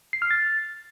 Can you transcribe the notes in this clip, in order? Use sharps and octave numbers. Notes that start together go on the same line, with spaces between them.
C7
F6
A6